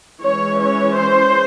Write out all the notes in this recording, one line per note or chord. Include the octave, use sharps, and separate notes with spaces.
E3 G#3 C#4 C#5
C#5
C5